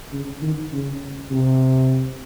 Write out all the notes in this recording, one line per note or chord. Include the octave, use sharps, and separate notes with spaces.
C#3
D#3
C#3
C3